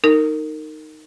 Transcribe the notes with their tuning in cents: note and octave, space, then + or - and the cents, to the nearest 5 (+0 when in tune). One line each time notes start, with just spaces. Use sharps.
D#4 +0 A#4 -25